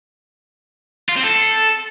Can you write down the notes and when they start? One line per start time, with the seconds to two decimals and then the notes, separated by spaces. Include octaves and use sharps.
1.09 F4
1.16 C4
1.23 A4